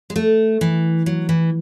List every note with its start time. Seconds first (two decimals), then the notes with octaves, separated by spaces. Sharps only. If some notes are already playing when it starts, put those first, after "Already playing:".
0.10 G#3
0.16 A3
0.61 E3
1.06 F#3
1.29 E3